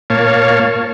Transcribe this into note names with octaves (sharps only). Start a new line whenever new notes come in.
A#2 A#3 C#5 F5 A5